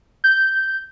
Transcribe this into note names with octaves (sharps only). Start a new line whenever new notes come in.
G6